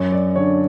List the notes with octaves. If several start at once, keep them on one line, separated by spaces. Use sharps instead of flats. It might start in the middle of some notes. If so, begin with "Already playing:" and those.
Already playing: F#2 C#5
D5
D3 C#5